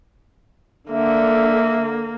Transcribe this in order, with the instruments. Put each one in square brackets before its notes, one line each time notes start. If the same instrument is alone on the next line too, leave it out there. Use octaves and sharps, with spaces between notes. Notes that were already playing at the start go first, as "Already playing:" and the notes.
[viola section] D3 [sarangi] A#3 [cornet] E5